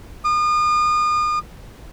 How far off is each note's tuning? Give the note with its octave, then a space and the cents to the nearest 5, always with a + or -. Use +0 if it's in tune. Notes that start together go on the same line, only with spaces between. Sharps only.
D#6 -40